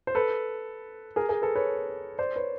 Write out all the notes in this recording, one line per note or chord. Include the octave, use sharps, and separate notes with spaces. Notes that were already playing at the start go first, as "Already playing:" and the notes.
C5
A4 B4
G#4 A#4
G#4 A#4
A4 B4
B4 C#5
C5 D5
B4 C#5